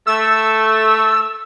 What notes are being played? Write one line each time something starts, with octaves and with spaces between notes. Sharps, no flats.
A3 E6